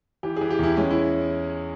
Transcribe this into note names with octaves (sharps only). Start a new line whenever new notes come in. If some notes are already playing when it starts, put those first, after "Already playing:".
E3 G4
G#4
E3
G4
E2 E4
G#3 C#4
E4